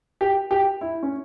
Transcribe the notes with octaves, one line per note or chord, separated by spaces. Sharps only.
G4
G4
E4
C#4